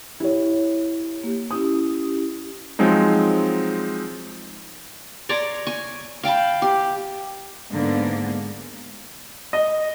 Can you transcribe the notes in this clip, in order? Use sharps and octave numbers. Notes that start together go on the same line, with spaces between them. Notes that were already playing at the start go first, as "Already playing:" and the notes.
E4 G4 C#5
A#3 G4
C#4 E4 G4 D#6
F3 F#3 G#3 C4 D#4
C#5 D5 A#5 C6
G#5 C#6
F5 G5 A5 B5
G4
G#2 D3 A#3 B3
D#5